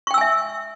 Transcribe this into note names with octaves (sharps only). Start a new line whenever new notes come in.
E5 G5 G#5 C#6 E6